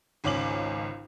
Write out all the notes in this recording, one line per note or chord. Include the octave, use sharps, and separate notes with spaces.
G#1 C#2 C#4 D6 F#7